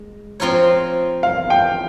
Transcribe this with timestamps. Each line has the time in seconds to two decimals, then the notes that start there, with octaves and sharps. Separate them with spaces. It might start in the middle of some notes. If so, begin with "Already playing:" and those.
Already playing: G#3
0.40 F3 C4 F4 A#4 C#5
1.23 F5
1.50 G5